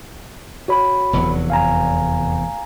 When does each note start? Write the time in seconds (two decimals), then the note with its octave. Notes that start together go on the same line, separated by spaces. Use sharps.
0.68 F#4 C#5 B5
1.13 F1 E2 F#3
1.50 F5 G#5 A#5